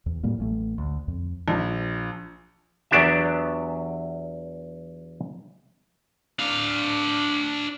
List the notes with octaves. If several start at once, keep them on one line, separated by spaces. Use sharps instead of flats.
E2
A2 F#3 G3 A#3
A1 A3
D2
F2
A#1
E2 F#3 B3 D4 G4 E5
D4 F5